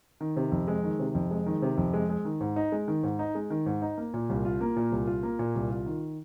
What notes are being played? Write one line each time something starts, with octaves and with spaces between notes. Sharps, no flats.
D#3
C3
F2
G#3
D#3
C3
F2
G#3
D#3
C3
F2
G#3
G#3
D#3
G#2
D#4
G#3
D#3
G#2
D#4
G#3
D#3
G#2
D#4
A#3
A#2
C2
F4
A#3
A#2
C2
F4
A#3
A#2
C2
F4
D#3